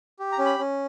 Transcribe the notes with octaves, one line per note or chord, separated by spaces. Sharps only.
G4
A#5
C#4
B5
C#4